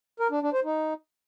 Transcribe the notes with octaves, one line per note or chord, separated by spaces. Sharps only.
A#4
D4
D4
C5
D#4